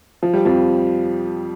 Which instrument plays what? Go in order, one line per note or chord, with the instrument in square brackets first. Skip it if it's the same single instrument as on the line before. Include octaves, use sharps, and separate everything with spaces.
[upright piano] F3
G3
F2 F3